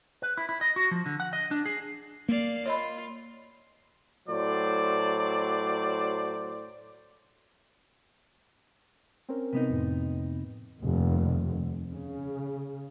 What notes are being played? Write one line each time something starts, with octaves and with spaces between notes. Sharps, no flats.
B4
E4
E4
D#5
F#4
F3
D3
F#5
D#5
D4
G#4
A#3 D5 F5
F4 C#5 D#5 B5
A2 F#3 C5 D5
C4 C#4 A#4
C3 B3 D#4
F2 A2
F1 D#2
C#3